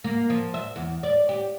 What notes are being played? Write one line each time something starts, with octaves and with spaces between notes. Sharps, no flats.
A#3
F3
E5
E2
D5
G4